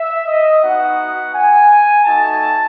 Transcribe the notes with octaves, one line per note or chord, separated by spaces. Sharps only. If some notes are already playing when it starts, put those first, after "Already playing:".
Already playing: E5
D#5
B3 D#4 F#4 F#5
G#5
A3 D#4 F#4 A5